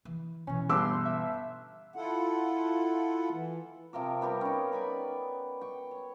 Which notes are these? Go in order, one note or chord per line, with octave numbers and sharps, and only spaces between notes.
E3
B2 E3 C#4
G1 C6 D6 E6
E5
E4 F4 A4 F#5
E3
C3 F3 A#4 D6
G3 B3 G4 A#4
C#4 D#4
D5 G#5 B5 D6
G5 C#6
C#5